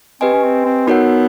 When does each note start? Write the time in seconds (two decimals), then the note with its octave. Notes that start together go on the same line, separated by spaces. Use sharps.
0.21 C4 G4 B4 D#5 G#5
0.33 C#4
0.43 C4
0.65 C4
0.87 B3 D#4 F#4 A#4 C#5 F#5